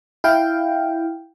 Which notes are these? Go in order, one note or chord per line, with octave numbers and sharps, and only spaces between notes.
E4 F5 G5